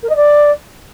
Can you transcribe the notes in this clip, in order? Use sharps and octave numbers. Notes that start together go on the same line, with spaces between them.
A#4
D#5
D5